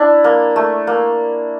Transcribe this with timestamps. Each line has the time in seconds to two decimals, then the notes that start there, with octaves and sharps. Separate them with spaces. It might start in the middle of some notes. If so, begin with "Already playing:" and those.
Already playing: D4 E4
0.24 A#3
0.56 A3
0.87 A#3